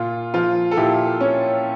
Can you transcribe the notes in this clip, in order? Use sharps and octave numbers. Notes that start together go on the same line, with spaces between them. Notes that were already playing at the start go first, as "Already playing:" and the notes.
Already playing: A#2 F4
F3 F4
A4
A#2 E4 G4
C#4